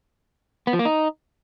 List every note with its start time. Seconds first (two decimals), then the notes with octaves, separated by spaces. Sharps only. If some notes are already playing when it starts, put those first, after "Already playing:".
0.67 B3
0.73 F3
0.79 A#3
0.85 D#4